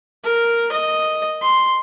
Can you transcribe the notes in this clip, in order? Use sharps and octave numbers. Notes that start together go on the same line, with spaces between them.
A#4
D#5
C6